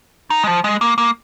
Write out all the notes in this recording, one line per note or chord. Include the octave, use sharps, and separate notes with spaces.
D#4
G#3
F3
G#3
A#3
A#3